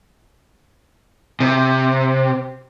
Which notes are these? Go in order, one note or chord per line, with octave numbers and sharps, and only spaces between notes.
C3